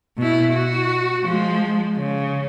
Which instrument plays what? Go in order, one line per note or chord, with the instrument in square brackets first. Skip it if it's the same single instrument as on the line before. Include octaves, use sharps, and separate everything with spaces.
[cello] B2 E4
F#4
F3 G#3
C#3